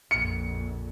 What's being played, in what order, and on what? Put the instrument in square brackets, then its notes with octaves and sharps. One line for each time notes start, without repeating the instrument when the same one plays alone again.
[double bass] A#1 F2 [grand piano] C#7